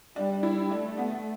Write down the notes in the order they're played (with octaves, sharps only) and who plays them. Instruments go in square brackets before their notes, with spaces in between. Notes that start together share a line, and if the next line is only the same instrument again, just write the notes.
[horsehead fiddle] G3 [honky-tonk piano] D4
[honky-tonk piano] E4
[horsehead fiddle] A3 [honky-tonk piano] D4
[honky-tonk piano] B3